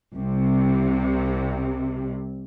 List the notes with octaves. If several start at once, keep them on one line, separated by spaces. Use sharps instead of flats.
C2 C3